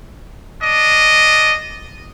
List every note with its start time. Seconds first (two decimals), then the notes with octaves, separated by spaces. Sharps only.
0.61 D4 D#5